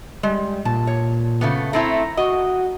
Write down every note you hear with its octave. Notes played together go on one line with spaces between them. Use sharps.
G3 G#3
A#2 A5
C#5
C#3 A3 B3
A3 C4 E4 A#5
F#4 D#5